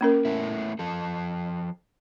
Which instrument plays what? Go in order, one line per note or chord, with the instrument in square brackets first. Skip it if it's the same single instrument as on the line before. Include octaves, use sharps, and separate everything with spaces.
[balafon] A#3 C#4 A#4
[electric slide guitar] A3 B3 E4
F3 A4